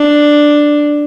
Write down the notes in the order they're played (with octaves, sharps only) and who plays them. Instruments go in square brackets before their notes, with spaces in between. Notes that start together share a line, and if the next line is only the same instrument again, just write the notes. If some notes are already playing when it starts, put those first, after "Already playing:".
Already playing: [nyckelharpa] D4